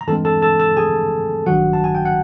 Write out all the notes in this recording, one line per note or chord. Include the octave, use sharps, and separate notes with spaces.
A#5
G2 E3 G#3 C4 A4 A5
A4 A5
A4 A5
A4 A5
G#4 G#5
A1 G2 D#3 F#3 F#4 F#5
A5
G#5
G5
F#5